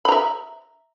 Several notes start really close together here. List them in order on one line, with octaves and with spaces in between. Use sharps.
B5 A#5 E5